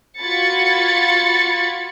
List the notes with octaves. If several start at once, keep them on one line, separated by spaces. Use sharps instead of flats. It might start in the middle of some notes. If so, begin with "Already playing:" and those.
F4 F#4 B5 G#6 A6 C#7